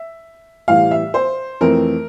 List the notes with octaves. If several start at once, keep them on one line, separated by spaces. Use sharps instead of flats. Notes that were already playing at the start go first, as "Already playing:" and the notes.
Already playing: E5
A2 E3 G3 F5
E5
C5
F2 E3 A3 C4 A#4